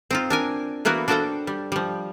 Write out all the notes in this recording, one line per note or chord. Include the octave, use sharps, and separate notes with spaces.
C4 D#4 F4
D4 A#4 G#5
E3 A#3 B3 F#4 A#4
D4 F#4 A4 C5 F5 G5
G3
F3 G3